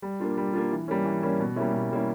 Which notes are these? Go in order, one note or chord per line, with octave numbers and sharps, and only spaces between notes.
G3
A#3 D4 F4
G3
A#3 D4 F4
E3
G3 A#3 C#4
E3
G3 A#3 C#4
B2
G3 A#3 C#4 E4
B2
G3 A#3 C#4 E4